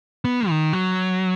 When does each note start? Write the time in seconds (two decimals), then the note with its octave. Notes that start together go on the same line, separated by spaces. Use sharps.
0.25 B3
0.49 D#3
0.73 F#3